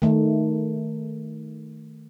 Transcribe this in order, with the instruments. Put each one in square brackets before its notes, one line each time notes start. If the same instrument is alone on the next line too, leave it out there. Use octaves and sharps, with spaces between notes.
[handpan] D#3 A3